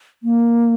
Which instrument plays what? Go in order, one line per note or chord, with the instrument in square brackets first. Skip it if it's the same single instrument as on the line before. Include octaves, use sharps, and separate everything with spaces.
[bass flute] A#3